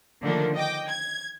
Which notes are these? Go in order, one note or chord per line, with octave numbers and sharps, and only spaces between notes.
D3 D#3 F3 A3 A#3 D4
D#5 G5 D6
G#6